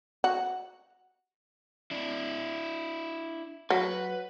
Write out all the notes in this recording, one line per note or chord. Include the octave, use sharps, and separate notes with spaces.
F#4
D4 E4
F#3 B4